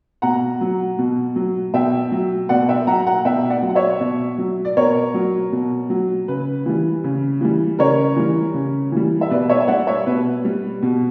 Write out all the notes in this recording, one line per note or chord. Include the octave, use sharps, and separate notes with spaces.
B2 F#5 A#5
F#3
B2
F#3
B2 E5 G5
F#3
B2 D5 F#5
E5 G5
F#3 F#5 A#5
F#5 A#5
B2 E5 G5
D5 F#5
F#3
F#5
C#5 E5
B2
F#3
D5
B2 A#4 C#5
F#3
B2
F#3
C#3 B4
E3 G3
C#3
E3 G3
C#3 A#4 C#5
E3 G3
C#3
E3 G3
E5
B2 B4 D5
C#5 E5
E5
G3 D5 F#5
C#5 E5
B2 B4
G3
B2